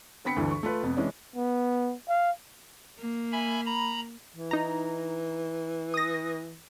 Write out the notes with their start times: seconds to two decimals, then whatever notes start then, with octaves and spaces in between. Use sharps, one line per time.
0.25 D3 B3 C4 B5 B6 C#7
0.36 D2 G2 E3 D4
0.51 C#6
0.63 A3 F4 B4
0.83 F1 F2 B3
0.96 C3 E3 G#3 C#4 D4
1.36 B3
2.08 F5
2.99 A#3
3.32 E5 G#5 B5
3.66 A#5 B5
4.36 E3
4.51 D#4 A#5
5.94 D#6 A#6